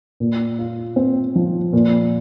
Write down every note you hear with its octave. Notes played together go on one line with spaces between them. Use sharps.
A#2
F4
C4
F3
A#2